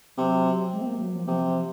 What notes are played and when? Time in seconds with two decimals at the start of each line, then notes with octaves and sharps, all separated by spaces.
0.17 C3 F#3
0.72 G#3
0.82 C4
0.86 A#3
1.00 F#3
1.13 F3
1.27 C3 F3
1.45 F3